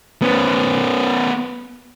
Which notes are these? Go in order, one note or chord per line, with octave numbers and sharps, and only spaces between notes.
B3 C#4